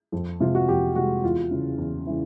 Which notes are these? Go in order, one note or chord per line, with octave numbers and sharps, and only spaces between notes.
F2
C3 F3 G#3 F4
F#4
F2 G4
C3 F3 G#3 F#4
E2 F4
C#3 E3
E2
C#3 E3